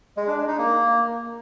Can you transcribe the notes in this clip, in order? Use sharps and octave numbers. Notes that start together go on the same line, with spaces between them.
G#3
D4
D4
D#4
A#3